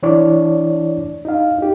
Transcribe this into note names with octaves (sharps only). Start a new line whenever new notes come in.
E3 D4 E4 C#5 D5
D#4 F5
D#4 G4